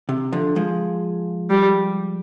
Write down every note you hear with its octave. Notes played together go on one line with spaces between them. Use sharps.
C3
D3 F3
F3 G#3
G3